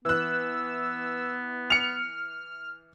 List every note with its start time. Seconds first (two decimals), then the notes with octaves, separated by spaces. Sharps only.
0.05 E3 B3 E6 F#6
1.70 F6 C#7 F7